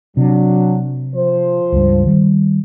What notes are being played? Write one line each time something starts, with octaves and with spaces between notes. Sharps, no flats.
C3 F#3 D4
F3 C5
C#2 G2
D#3 G3